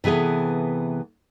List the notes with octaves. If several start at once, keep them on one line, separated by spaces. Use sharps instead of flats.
C3 E3 B3 G#4 A4